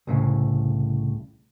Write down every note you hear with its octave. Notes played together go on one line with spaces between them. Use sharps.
C2 A2 C#3